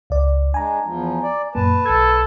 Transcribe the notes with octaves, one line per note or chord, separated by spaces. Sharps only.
C#2 D5
G#3 D4 G#5 A#5
E2 F3
D5
F#2 A#2 A#3 B4 A5
B1 A4 G#6